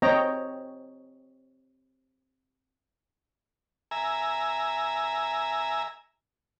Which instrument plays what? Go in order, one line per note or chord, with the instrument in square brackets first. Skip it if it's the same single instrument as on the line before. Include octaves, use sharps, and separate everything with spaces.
[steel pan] C4 C#5 D#5 G5 A#5
[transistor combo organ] E5 G#5 A#5